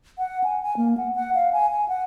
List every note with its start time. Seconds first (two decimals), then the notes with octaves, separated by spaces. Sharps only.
0.18 F#5
0.44 G#5
0.62 G#5
0.77 A#3
0.98 F#5
1.15 F#5
1.35 F5
1.53 G#5
1.71 G#5
1.88 F#5